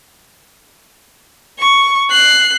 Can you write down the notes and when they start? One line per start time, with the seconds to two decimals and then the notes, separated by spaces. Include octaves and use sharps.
1.59 C#6
2.11 F#6 C7